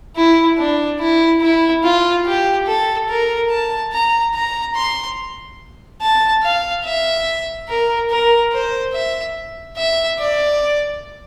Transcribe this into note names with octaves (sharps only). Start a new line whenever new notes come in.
E4
D4
E4
E4
F4
G4
A4
A#4
A5
A#5
A#5
C6
A5
F5
E5
A#4
A#4
C5
E5
E5
D5